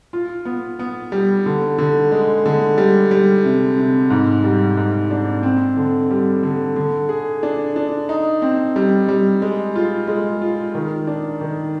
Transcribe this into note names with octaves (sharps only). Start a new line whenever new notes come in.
F4
B3
B3
G3
D3
D3
G#3
D3
G3
G3
C3
C3
G#2
G3
G#2
D4
C4
D3
G3
D3
D3
G#4
D4
D4
D#4
C4
G3
G3
G#3
F4
G#3
F4
D#3
D4
D#3